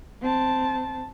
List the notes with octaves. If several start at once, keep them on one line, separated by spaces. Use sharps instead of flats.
C4 A5